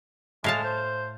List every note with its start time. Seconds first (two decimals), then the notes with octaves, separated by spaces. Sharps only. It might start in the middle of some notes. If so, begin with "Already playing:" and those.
0.44 A2 G#3 F5 A5
0.63 C5